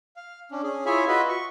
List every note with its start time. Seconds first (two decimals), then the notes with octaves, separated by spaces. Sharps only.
0.16 F5
0.51 C#4 D4
0.63 C#4 G#4
0.86 E4 F4 G#4 C#5 E5 G#5
1.08 F4 F#4 B4 D#5 E5 B5
1.29 C#6